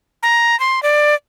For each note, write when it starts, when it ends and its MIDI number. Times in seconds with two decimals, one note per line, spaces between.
0.23 0.58 82
0.60 0.82 84
0.83 1.15 74